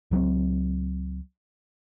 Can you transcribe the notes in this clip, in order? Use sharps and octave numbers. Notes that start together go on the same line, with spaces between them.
C#2 F#3 G#3 C4